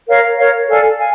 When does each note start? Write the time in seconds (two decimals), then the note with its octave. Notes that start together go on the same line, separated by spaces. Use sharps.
0.08 A#4 C#5 F5
0.38 A#4 C#5 F5
0.69 A4 D5 F5 G#5
0.99 F5 G#5